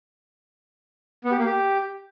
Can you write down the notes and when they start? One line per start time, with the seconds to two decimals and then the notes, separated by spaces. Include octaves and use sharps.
1.24 B3
1.31 G4
1.39 A#3
1.46 G4